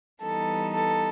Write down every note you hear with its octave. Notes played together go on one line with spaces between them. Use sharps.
E3 G3 B3 D#4 A4
A4